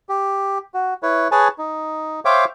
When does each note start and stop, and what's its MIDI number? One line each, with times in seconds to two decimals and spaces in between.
0.09 0.58 67
0.74 0.94 66
1.03 1.28 64
1.03 1.28 71
1.03 1.28 73
1.32 1.48 68
1.32 1.48 71
1.32 1.48 73
1.32 1.48 80
1.32 1.48 81
1.58 2.20 63
2.25 2.45 72
2.25 2.45 73
2.25 2.45 76
2.25 2.45 77
2.25 2.45 79
2.25 2.45 86